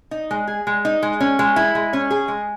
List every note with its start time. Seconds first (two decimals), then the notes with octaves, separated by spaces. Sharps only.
0.11 D#4
0.31 G#3
0.47 G#4
0.67 G#3
0.85 D#4
1.02 G#3
1.20 C#4
1.39 G#3
1.56 E4
1.75 G#3
1.93 C#4
2.11 G#4
2.28 G#3